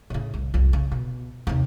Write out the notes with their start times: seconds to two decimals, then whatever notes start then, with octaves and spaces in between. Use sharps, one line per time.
0.10 A2 C#3
0.34 C2
0.54 C2 F2
0.73 C#3
0.92 B2
1.47 D#2 C3